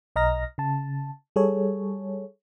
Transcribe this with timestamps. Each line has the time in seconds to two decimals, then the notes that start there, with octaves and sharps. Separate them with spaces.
0.16 B1 D#5 A#5 F6 A#6
0.58 C#3 A5
1.36 G3 G#4 A4 C#5